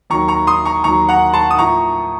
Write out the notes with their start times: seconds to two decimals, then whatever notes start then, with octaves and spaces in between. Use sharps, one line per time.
0.10 D#2 D#3 F#3 A#5 C#6
0.28 A#5 C#6
0.47 C6 D#6
0.66 A#5 C#6
0.84 D#2 D#3 F#3 A#5 C#6
1.09 F#5 A#5
1.34 A5 C6
1.51 D#6
1.58 A2 F3 A#5 C#6